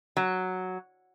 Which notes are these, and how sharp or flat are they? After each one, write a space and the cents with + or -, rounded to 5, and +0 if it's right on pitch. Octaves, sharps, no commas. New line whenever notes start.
F#3 +0